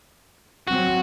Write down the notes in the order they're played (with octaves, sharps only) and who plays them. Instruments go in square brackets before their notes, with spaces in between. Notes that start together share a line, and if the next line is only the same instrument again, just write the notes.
[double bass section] F#3 C4 [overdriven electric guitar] F#4